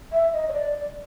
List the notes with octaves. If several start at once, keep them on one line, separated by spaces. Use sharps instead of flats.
E5
D#5
C#5
D5